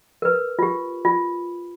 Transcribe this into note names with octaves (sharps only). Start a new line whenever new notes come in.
A#4 B4
F4 G4
F4